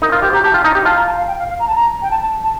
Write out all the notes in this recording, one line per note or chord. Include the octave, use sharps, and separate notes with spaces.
D#4 A#4
F4 A#4
G4 C5
G4 A#5
G4 A5
F4
D#4 A#5
G4
F4 A5
A#5
A5
F5
G5
F5
F5
A#5
A5
A#5
G5
A5
A5
A5